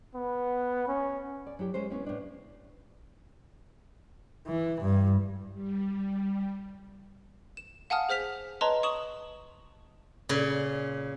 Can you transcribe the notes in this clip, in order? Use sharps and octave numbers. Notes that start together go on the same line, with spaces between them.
B3
C#4
D5
F#3 E4 G4
G#3 C#4 C5
B3 C#4 E4
A2 D4
E3
G2
G3
E7
F5 F#5 G#5 A5 D#6 F6
G#4 C5 F6 B6 F7
B4 C#5 D#5 A5 A#5 C6
C#6 D#6 E7 F#7
A#2 C#3